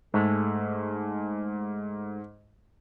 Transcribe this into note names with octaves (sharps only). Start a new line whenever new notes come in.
G#2 G#3 A3